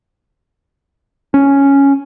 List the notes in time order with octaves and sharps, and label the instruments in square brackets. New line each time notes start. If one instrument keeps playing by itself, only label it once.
[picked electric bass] C#4